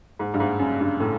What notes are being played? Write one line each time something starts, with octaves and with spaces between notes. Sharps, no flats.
G#2
G2
G#2
F#2
G2
A2